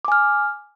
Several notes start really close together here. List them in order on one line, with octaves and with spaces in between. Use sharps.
D6 G#5 F6